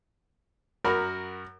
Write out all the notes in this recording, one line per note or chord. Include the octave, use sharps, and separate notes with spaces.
F#2 F#4 A#4 B5